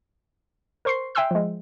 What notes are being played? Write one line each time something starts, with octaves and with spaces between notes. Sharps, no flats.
A#4 C5 C6 C#6 C7
E5 G5 G#5 C6 E6 F#6
F3 G#3